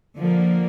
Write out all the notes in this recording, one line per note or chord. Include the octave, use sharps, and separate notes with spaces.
D3 F3 A#3